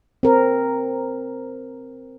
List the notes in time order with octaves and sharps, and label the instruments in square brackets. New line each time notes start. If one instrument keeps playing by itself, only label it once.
[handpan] C4 A#4